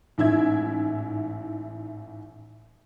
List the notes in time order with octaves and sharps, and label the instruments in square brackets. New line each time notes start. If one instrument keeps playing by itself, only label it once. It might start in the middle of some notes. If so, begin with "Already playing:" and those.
[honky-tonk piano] A1 G#2 E4 E5 G#6